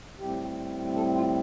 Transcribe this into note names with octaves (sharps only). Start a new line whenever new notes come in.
A2 G3 C4 G4
A4
F4